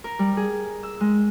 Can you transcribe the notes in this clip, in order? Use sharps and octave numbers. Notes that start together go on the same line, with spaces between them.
A#4
G3
G#4
E6
G#3